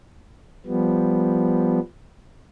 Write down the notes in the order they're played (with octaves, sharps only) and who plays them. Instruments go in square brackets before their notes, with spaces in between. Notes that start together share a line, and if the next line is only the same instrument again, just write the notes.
[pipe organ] F3 G3 B3